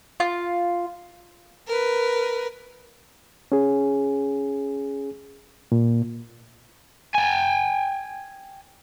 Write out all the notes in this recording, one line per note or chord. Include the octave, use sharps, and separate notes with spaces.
F4
A#4 B4
C#4 G#4
A#2
G5 G#5